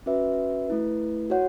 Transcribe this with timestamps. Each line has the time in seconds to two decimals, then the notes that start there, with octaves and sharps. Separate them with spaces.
0.06 C#4 F#4 B4 E5
0.68 A3 E4 B4
1.30 F#4 C#5 F#5